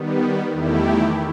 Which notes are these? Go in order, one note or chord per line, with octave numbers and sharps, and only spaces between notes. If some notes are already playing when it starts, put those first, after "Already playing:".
Already playing: D#3 G3 B3
E2 D#3 A3 E4 G4